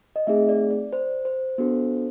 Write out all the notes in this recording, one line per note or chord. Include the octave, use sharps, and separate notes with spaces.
D#5
A3 C4 D#4 G#4 E5
D5
D5
C5
C5
B3 D4 F#4 A4